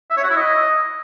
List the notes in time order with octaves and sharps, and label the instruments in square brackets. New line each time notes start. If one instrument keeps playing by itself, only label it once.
[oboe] E5
C#5
F#4
E4
D#5